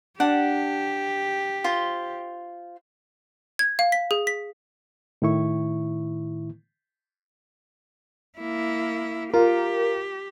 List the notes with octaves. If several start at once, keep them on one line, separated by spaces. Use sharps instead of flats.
D4 G4 F#5
F4 C5 C6
G#6
F5
B6
G#4
B6
A2 D#3 E4 C#6
A#3 E4
F4 G4 A#4